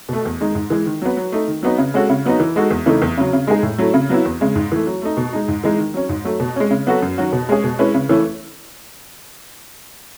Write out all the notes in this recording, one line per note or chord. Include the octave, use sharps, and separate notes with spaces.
B2 A3
E2
D#3 G#3 D#4
G#2
E3 G#3
D#3
F#3 B3
F#3
A3 D#4
D#3
F#3 B3 D#4
C#3
G#3 C#4 F#4 A4
C#3
F#3 B3 D#4
E3
G#3 D#4 F#4 A4
E2
C#3 E3 A3 D#4
E2
C#3 F#3
C#3
G#3 D#4 G#4
A2
F#3 A3 E4
C#3
F#3 B3 E4
E2
C#3 G#3
G#2
E3 A3
F#3
A3 D#4
B2
G#3 D#4
G#2
E3 G#3 D#4
D#3
F#3 C#4
G#2
F#3 A3
B2
G#3 C#4
C#3
F#3 B3 F#4 A4
F#2
D#3 F#3 C#4 F#4
B2
G#3 C#4 G#4
B2
G#3 C#4 E4 B4
C#3
E3 A3 C#4 E4